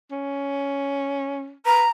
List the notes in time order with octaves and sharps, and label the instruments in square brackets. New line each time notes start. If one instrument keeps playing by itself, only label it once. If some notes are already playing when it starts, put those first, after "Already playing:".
[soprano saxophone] C#4
[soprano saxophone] B4 [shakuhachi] A#5